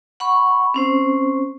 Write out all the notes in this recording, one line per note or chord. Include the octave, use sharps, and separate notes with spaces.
F#5 B5 C#6
C4 C#4 C5